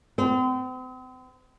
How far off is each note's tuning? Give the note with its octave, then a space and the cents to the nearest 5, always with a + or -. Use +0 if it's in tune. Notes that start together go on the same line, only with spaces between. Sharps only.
C4 -40